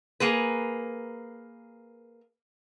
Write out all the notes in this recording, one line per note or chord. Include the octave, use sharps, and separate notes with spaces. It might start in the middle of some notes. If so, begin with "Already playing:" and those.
A#3 G#4 B4